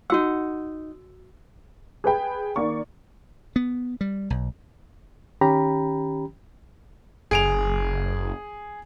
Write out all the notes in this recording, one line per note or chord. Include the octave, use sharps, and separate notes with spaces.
D#4 F#4 F#5 E6
G#4 B4 G5 B5
D#3 A#3 D5 C#6
B3
G3
B1
D#3 C#4 G4 G5 A#5 B5
F#1 G#4 D7 F7